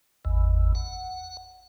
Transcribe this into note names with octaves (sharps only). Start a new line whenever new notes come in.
G#1 E2
F#5